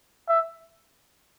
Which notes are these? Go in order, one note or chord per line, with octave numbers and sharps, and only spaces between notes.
E5